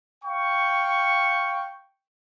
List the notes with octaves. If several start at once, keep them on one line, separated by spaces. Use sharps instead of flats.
F5 G5 C#6